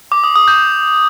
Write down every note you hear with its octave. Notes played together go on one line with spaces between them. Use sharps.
D6
D#6
D#6
G6